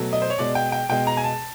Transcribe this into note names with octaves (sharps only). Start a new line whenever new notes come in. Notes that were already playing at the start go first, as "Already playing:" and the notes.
Already playing: B2 F#3 A3
D#5
C5
C#5
B2 G#3 D5
G5
G5
B2 G#3 G5
A#5
G#5
A5